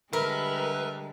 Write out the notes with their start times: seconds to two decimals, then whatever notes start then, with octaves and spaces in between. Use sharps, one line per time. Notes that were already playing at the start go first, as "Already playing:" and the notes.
0.13 D3 G3 G#3 A#4 B4 E5 F6